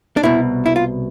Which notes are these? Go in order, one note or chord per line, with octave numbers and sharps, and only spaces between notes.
D4
C2 B2 E4
E4
F4